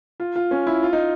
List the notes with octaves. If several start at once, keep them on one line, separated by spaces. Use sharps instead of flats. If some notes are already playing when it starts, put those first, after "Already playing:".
F4
F4
C#4
E4
F4
D#4